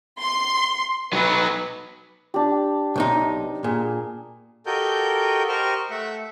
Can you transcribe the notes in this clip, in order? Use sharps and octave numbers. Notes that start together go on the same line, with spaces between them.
C6
F#3 D#4 B4
D4 G4
B1 C3 D#4
A#2 G#4
F#4 G4 A4 A#4 D#5 G6
G4 A#4 C5 D#5 C#6 F6
A3 E5 F#5